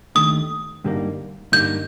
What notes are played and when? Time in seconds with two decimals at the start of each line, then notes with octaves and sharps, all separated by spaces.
0.15 D#2 D#3 A3 D4 D#6
0.84 G2 D3 G3 A#3 D#4
1.52 G2 D3 G3 A#3 D#4 G6